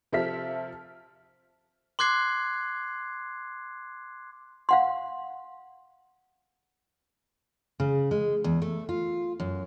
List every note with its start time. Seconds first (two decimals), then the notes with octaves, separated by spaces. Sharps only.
0.12 C3 F3 A4 E5 F6 B6
1.99 C6 D6 F#6 G#6 C7
4.69 F5 F#5 C6
7.80 C#3
8.11 G#3
8.44 E2
8.62 A3
8.89 F4
9.40 F#2